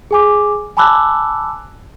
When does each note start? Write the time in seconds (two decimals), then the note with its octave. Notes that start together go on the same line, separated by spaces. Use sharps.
0.11 G#4 G#5 D6
0.77 G#5 A5 B5 D6 E6 F#6